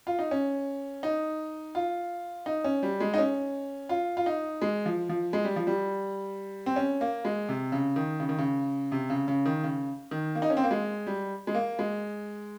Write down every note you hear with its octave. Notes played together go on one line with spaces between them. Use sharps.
F4
D#4
C#4
D#4
F4
D#4
C#4
G3
G#3
D#4
C#4
F4
F4
D#4
G#3
F3
F3
G#3
G3
F3
G3
C4
C#4
A#3
G#3
C3
C#3
D#3
C#3
D#3
C#3
C3
C#3
C#3
D#3
C#3
D#3
A#3
D#4
C#4
C4
A#3
G#3
G3
G#3
A#3
G#3